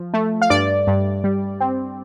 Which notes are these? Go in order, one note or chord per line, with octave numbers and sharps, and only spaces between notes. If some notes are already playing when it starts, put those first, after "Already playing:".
Already playing: F3
A3
F5
G2 D5
G2
G3
C4